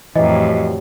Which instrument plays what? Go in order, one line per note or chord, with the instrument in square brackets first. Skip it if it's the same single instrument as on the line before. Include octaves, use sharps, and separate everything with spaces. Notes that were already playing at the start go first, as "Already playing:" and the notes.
[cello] F2 A2 [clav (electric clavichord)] E3 [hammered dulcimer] F#3 G3 [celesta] D#5